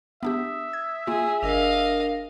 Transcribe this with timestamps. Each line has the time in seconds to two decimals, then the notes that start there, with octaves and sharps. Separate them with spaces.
0.23 B3 D4 G4 E5 D#6
0.73 G#6
1.07 A#3 F4 G#4
1.43 G1 D4 A#4 D#5 F5